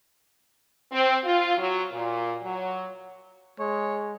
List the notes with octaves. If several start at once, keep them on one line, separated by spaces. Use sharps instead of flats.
C4
F4
F#3
A#2
F#3
G#3 C#5